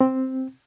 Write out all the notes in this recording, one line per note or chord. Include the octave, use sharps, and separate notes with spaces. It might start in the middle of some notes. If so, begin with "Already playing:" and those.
C4